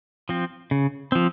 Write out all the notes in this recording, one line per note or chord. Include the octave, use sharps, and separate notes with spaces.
F3 C4
C#3
F3 C4